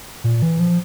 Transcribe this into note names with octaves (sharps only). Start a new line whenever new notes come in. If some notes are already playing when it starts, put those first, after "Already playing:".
A#2
E3
F3